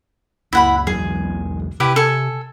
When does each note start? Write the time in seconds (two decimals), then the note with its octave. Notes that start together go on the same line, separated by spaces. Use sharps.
0.53 C#2 A#3 E4 F#5 B5
0.87 B1 E2 F#3 G#4
1.80 C3 E4 G4 B4
1.96 A4 G#5